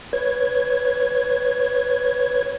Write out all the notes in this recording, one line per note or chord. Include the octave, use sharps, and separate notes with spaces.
B4 C#5 G#6